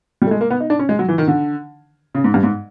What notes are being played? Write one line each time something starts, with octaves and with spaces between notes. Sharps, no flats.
G3
A3
G#3
A#3
B3
D#4
D4
C#4
G#3
F#3
E3
D#3
D3
C#3
G#2
G2
G#2